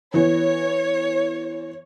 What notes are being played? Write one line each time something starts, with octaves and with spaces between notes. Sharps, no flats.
E3 B3 C#5